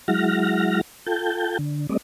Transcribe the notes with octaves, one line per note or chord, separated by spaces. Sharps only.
F#3 G#3 E4 F#5 F6 A#6
F4 A4 G5 A5 G6
D3
G3 A3 C4 D5 D#5